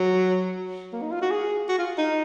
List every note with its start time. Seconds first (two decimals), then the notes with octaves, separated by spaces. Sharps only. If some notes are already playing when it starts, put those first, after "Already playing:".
Already playing: F#3
0.93 A#3
1.02 D#4
1.12 F4
1.22 F#4
1.31 G#4
1.69 F#4
1.79 F4
1.98 D#4